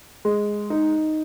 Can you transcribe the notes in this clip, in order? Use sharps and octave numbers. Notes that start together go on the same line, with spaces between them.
G#3
D#4